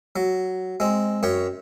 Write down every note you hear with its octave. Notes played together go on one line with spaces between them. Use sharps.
F#3
G#3 C4
F#2 C#5 G5